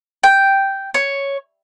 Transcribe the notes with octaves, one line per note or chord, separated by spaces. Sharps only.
G5
C#5